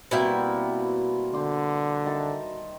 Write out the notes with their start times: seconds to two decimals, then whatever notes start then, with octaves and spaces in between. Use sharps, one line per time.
0.11 B2 G3 A#3 C4 E4 G5
1.33 D3 C5 C6 D6
2.06 D#3 E5 A5